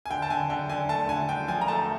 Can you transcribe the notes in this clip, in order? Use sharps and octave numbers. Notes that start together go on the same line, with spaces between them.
G#5
D3 G5
A5
D3 G#5
D3 G5
D3 G#5
A3 A5
D3 G#5
D3 G5
F3 G#5
A#5
A3 A5